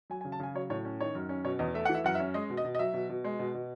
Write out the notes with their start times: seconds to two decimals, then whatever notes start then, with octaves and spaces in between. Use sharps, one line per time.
0.10 F#3 G#5
0.21 G#5
0.25 C#3
0.32 A5
0.40 C#3 G#5
0.55 F#3 C#5
0.70 A2 C#5
0.85 C#4
1.01 D#3 C#5
1.15 F#2
1.29 C#4
1.44 B2 C#5
1.59 E2 D#5
1.74 A3 E5
1.85 E3 F#5
1.94 E5
2.04 F#2 F#5
2.15 E5
2.20 C#4
2.34 G#3 D#5
2.50 B2
2.57 D#5
2.64 B2
2.75 D#5
2.79 F#3 E5
2.94 B2
3.09 B2
3.24 G#3
3.39 B2
3.54 B2